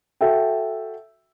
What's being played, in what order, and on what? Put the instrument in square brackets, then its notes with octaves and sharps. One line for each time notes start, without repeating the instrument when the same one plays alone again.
[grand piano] F#4 A4 E5 G5